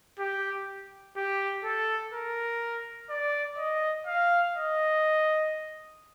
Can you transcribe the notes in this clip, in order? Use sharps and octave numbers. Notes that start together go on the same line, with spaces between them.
G4
G4
A4
A#4
D5
D#5
F5
D#5